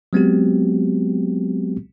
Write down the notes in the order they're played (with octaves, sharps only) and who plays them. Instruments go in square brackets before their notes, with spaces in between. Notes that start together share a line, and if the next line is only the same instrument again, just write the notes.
[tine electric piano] F#3 G#3 B3 C4 F#4 G4